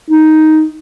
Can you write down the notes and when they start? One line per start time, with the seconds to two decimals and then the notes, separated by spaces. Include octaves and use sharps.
0.10 D#4